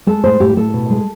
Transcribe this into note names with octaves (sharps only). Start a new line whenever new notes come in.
G#3 A4
A2 C5
A2 G4
A2 A4
B2
G#3